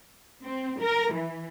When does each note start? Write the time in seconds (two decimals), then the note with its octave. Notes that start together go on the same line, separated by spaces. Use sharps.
0.43 C4
0.81 A#4
1.13 E3